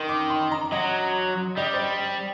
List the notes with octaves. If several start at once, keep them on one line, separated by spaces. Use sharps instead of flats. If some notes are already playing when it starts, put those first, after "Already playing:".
Already playing: D#3 C6
D6
C6
A#5
F#3 D#5
G3 D#5
D5
C5
D5